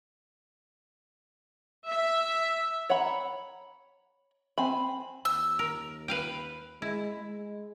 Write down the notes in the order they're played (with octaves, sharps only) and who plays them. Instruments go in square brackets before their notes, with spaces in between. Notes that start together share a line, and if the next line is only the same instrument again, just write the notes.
[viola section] E5
[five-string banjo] C#5 F#5 A#5 B5
C4 G#5 B5
[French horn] D#2 [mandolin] E6
[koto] A#4
B4 F5 G5
[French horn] G#3 [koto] E4
[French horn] G#3